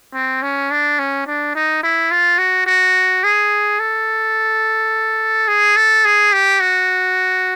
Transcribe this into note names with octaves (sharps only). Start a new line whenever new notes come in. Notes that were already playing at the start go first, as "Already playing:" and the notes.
C4
C#4
D4
C#4
D4
D#4
E4
F4
F#4
F#4
G#4
A4
G#4
A4
G#4
G4
F#4